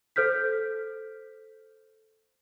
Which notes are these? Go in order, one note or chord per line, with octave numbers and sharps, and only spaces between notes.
A4 C5 F6 G6 B6